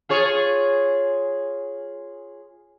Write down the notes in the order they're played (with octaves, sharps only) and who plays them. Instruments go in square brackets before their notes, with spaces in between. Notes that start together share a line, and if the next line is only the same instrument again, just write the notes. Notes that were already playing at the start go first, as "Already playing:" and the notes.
[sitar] F4 G#4 C#5